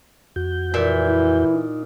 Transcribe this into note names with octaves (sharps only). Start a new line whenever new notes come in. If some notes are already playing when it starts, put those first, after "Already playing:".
F2 F#4 G6
A#2 E3 E5
E4
D#4